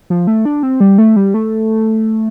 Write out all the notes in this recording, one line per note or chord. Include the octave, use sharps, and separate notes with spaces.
F3
A3
D4
C4
G3
A3
G3
A3